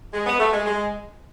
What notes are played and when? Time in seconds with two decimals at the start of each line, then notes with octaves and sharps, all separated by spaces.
0.13 G#3
0.26 B3
0.39 A3
0.52 G#3
0.66 G#3